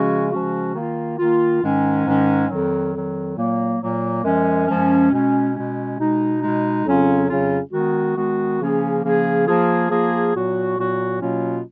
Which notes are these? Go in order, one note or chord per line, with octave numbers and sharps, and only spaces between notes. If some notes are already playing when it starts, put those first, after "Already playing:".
Already playing: C#3 F3 G#3 C#4 F#4
C#3 F3 G#3 C#4 F#4
D#3 A#3 F4
D#3 A#3 F4
G#2 D#3 G#3 C#4
G#2 D#3 G#3 C#4
F2 D#3 F#3
F2 D#3 F#3
A#2 F#3 A#3
A#2 F#3 A#3
F#2 F3 G#3 C#4
F#2 F3 G#3 C#4
B2 G#3 C#4
B2 G#3 C#4
B2 G#3 D#4
B2 G#3 D#4
F2 C#3 F#3 C#4 F4
F2 C#3 F#3 C#4 F4
D#3 G#3 B3 F#4
D#3 G#3 B3 F#4
C#3 F3 A#3 C#4 G#4
C#3 F3 A#3 C#4 G#4
F3 A#3 F4 G#4
F3 A#3 F4 G#4
A#2 F#3 B3 F#4
A#2 F#3 B3 F#4
B2 F#3 A#3 C#4 F4